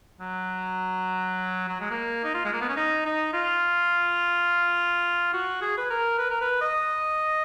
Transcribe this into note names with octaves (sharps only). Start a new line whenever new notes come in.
F#3
F#3
G#3
A#3
D#4
F4
G#3
A#3
B3
C#4
D#4
D#4
F4
F#4
G#4
B4
A#4
B4
A#4
B4
D#5